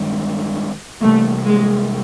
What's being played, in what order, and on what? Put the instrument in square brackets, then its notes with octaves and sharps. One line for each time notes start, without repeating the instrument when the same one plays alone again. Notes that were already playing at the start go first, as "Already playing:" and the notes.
Already playing: [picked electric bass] G2 D#3 G#3
[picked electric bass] C3 E3 G3 A#3 [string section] A3
[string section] G#3